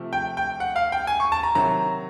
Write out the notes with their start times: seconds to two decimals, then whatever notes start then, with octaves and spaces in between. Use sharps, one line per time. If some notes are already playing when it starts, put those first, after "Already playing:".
Already playing: C3 F3 A3
0.13 G5
0.37 G5
0.60 F#5
0.76 F5
0.92 G5
1.07 G#5
1.20 C#6
1.32 A5
1.43 A#5
1.55 C3 D#3 F#3 A#5